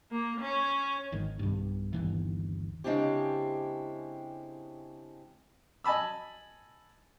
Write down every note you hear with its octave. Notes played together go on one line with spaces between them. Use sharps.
A#3
C#4
G#1 D#3
B1 G2
G1 D#2 E3
C#3 G#3 C4 D4 E4 G4
D#5 G#5 A5 B5 E6